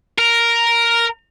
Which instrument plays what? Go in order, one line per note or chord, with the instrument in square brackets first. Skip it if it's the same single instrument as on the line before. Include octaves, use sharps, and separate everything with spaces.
[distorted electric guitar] A#4